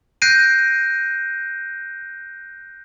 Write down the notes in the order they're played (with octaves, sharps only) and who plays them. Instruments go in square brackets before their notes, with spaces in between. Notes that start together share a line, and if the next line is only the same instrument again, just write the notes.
[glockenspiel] F#6 G6 A#6 C7 D7 D#7